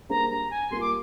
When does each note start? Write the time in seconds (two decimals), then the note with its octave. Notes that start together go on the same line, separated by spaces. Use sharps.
0.09 G3 A#3 D4 G#4 C5 A#5
0.30 A#5
0.51 G#5
0.71 G3 A#3 F4 C6
0.81 D6